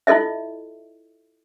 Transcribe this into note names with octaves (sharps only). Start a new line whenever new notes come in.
E4 F4 A4 D#5 E5